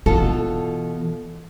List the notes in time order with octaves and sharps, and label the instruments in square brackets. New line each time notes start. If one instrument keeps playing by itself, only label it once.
[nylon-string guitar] B2 F4 A4 [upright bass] E3